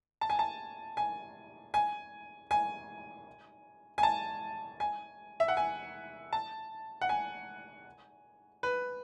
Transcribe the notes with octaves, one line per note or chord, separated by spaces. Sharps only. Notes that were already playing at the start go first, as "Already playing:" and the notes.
A5
G#5
A5
G#5
G#5
G#5
G#5
A5
G#5
E5
F#5
G#5
A5
F#5
G#5
B4